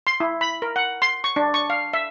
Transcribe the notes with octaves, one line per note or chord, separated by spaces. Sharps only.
C6
E4
B5
A#4
F#5
C6
C#6
D4
C#6
F5
E5